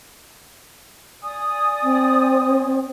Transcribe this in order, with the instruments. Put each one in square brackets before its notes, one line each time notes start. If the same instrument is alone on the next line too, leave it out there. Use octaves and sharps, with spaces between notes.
[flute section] D5 G#5 D#6
[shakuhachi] C4